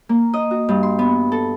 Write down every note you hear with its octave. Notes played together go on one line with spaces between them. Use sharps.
A#3
D#5
F#4
G2
C6
B3
A4